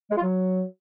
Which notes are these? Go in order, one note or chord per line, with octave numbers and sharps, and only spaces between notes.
G#3
F4
F#3